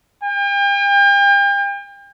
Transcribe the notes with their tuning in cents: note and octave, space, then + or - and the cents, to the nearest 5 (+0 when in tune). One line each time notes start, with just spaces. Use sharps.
G5 +40